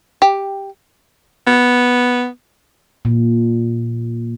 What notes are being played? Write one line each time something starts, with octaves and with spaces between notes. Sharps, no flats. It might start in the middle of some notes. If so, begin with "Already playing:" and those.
G4
B3
A#2